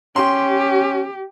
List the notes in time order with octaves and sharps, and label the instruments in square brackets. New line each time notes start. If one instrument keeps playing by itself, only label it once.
[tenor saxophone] C#4 [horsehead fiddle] G4 [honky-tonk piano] C6